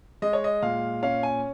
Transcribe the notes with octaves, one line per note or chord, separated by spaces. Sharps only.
G#3 D#5
C#5
D#5
A#2 F5
C#4 F5
G#5